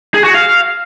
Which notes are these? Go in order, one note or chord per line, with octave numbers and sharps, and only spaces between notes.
G#4
F#4
F5